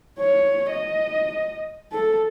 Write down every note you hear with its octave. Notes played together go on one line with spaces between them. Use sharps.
C#5
D#5
A4